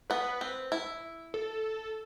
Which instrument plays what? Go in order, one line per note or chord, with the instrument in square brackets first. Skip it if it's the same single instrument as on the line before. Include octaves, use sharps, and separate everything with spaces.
[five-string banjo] B3 [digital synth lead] B4
[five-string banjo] C4
E4
[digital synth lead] A4